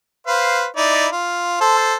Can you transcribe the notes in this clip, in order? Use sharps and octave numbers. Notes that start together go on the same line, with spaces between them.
B4 C5 F5
D#4 E4 D5
F4
A4 C5